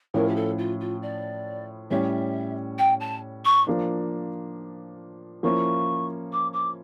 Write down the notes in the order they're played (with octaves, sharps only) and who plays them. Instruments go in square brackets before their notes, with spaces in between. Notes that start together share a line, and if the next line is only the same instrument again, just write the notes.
[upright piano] A2 F3 C#4 E4 [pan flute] A#4
[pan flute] G4
A4
F4
F4
D5
[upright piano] A2 G3 C#4 [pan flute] E5
[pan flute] G5
A5
C#6
[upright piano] F3 A#3 D4
[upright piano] F3 A#3 C#4 E4 [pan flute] C#6
[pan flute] D6
D6